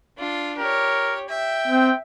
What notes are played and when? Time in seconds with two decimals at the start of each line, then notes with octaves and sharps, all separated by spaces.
0.18 D4 F4
0.58 G4 A#4 C#5
1.29 E5 G5
1.68 C4